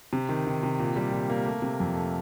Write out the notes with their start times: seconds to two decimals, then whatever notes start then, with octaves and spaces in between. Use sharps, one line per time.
0.13 C3
0.29 D#3
0.47 D#3
0.63 C3
0.79 A#2
0.96 G3
1.12 A#2
1.30 A#3
1.46 A3
1.62 C3
1.80 F2
1.95 A3